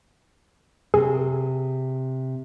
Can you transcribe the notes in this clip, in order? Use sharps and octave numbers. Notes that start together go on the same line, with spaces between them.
C3 G#4